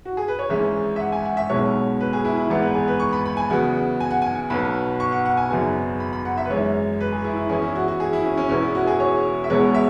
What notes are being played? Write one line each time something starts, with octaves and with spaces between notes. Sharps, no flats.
F#4
G#4
B4
C#5
G#1 G#2 E3 G#3 C#4 E5
E5
F#5
G#5
F#5
E5
B1 B2 G#3 B3 C#5
B4
G#4
E4
E4
G#1 G#2 E3 B3
B4
G#4
B4
C#6
B5
B5
G#5
E2 C#3 F#3 B3 F#5
G#5
F#5
G#5
B1 B2 B3 B5
C#6
F#5
F#5
G#5
G#1 F#2 C#3 F#3 B3 G#5
B5
B5
F#5
E5
B4
G#1 F#2 E3 G#3 C#4 C#5
B4
G#4
E4
E4
E2 E3 C#4 G#4
E4
F#4
F#4
G#4
E4
C#4
C#4
E1 E2 E3 C#4
E4
F#4
G#4
C#5
E5
E1 E2 B2 G#3 B3 C#5
E5